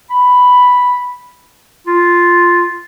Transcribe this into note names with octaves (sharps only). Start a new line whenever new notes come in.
B5
F4